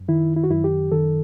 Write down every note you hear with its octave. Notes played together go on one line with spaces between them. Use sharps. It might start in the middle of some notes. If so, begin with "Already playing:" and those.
Already playing: F#2
D#3 E4
E4
F#4
F#2 E4
G4
D#3 A4